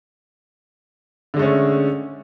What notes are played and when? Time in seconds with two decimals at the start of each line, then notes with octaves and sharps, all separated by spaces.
1.34 D3
1.37 G#3
1.39 A3
1.42 C#4